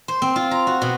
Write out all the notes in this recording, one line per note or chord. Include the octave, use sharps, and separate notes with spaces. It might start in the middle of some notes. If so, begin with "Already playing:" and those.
C5
C4
F4
A#5
F#4
B2